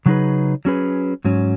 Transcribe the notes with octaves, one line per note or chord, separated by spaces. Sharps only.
C#3 F#3 D#4 G#4 B4
F#3 C#4 G#4 B4
G#2 F#3 C#4